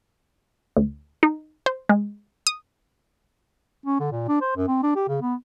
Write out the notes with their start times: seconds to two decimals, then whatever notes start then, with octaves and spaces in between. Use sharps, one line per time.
0.77 D2
1.23 D#4
1.66 C5
1.89 G#3
2.47 D#6
3.86 C#4
4.00 D3
4.12 A#2
4.28 D4
4.41 C5
4.56 F#2
4.68 C4
4.83 D4
4.96 G4
5.08 C#3
5.22 B3